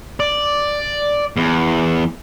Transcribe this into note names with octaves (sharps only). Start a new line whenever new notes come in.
D5
E2